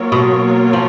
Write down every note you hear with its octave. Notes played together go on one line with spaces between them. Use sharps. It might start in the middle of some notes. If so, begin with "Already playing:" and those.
Already playing: F#3 A#3 F4 A#4 C#5
B2
F3